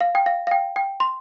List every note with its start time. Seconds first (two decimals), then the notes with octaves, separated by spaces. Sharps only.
0.01 F5
0.15 G5
0.26 F5
0.47 F5
0.51 G5
0.76 G5
1.00 C6